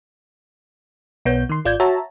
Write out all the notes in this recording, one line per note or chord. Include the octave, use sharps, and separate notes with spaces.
B1 B3 C#5 G6
D#3 C6
G#1 F4 D5 G6 G#6
F#4 C#5 E5 A5 A#5